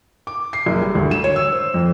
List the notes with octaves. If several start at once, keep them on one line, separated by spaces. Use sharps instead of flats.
D6
C7
F#1
G3
D2
E7
C#5
E6
C5
F2